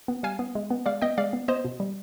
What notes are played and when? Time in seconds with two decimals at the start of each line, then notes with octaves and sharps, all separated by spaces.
0.08 B3
0.23 G3 F5 G#5
0.39 B3
0.55 G#3
0.70 B3
0.86 G#3 D5 F5
1.02 B3 D#5 G5
1.18 G#3 D5 F5
1.33 B3
1.48 B3 C5 D#5
1.65 B2
1.80 G3